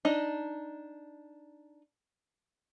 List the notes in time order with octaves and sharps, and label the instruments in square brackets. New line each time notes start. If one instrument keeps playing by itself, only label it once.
[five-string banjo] D4 D#4 D#5